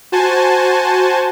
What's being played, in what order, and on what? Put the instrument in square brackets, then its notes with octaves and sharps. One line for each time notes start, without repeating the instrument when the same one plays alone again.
[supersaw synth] F#4 C5 G#5 A5